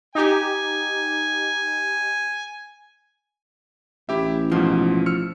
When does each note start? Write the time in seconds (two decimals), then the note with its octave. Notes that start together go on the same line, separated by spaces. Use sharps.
0.15 D#4 G4 G#5
4.09 A1 E4 G4 E5
4.52 G#2 B2 F3
5.06 E6 F6 C#7